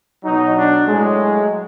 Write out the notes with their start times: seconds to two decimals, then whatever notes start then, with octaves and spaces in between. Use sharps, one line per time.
0.24 B2 F#3 D#4
0.57 D4
0.88 A2 F#3 G#3